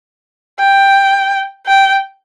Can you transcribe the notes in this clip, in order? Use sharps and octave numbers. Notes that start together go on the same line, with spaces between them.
G5
G5